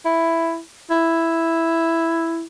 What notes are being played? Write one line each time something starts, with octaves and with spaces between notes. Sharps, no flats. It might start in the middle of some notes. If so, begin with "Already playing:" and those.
E4
E4